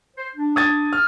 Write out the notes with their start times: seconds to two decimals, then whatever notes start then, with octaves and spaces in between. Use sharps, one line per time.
0.17 C5
0.36 D4
0.56 D#6 G#6 A6
0.93 F6